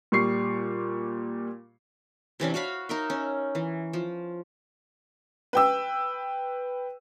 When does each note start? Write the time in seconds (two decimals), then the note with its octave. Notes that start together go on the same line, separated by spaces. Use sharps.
0.12 A#2 G3 C#6 C7
2.40 C3 E3 C#4 D4
2.54 F#4 C#5 F5 B5
2.89 D#4 A#4 E5
3.10 C#4
3.55 E3
3.93 F3
5.53 B4 G5 E6